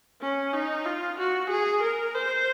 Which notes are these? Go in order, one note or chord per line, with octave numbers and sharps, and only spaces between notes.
C#4
D#4
F4
F#4
G#4
A#4
C5